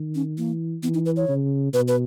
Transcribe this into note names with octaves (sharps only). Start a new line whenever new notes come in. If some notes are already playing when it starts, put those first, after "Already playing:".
Already playing: D#3
C#4
E3 A#3
E3 B3
D#4
B4
C#5
C#3
B2 B4
B4